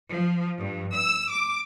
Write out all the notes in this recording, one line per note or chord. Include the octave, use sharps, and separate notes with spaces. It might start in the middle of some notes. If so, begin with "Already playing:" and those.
F3
G2
E6
D6